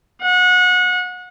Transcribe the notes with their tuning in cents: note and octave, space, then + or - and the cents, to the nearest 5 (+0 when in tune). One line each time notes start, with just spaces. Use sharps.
F#5 -30